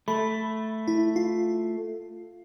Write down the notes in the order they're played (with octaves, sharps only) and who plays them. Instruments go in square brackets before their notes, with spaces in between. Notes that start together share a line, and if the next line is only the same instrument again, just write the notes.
[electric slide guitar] A3 [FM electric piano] B5
[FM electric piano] E4
F4